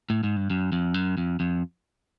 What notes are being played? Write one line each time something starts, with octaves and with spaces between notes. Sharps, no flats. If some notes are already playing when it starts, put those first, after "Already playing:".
A2
G#2
G2
F#2
F2
F#2
F2
F2